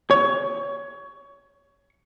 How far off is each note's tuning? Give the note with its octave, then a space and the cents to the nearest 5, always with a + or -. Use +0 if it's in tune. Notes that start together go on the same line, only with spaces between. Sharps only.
C#5 +20